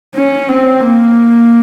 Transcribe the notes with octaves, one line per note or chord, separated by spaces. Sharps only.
C#4
C4
A#3